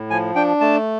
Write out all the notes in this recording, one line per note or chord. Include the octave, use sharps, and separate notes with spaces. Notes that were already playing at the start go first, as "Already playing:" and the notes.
Already playing: A2
F3 G#5
D4 G5
A3 A5